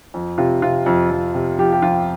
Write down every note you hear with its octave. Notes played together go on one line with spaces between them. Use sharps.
F2
C3 F4
C3 F4
F2
F2
C3
F3 G4
G4
F2 F4